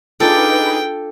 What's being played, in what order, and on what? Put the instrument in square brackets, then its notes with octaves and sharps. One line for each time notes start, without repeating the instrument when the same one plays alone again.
[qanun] D4 F4 [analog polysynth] D#4 G#4 B4 [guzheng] A4 [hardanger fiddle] G5